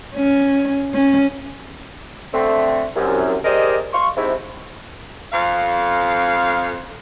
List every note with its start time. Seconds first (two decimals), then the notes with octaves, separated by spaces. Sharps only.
0.16 C#4
0.94 C#4
2.34 D3 A3 C4
2.96 C2 F#2
3.45 G4 G#4 A#4 C5 D5 D#5
3.93 F5 C6 C#6
4.17 G#2 C3 E4
5.33 F2 F5